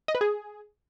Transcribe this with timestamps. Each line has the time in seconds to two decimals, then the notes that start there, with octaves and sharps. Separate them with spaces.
0.08 D#5
0.15 B4
0.21 G#4